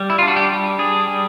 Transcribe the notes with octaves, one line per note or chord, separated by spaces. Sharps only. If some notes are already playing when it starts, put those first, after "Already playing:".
Already playing: G3
E4
F4
D4
F#4
G4
G3
D4 G#4
G3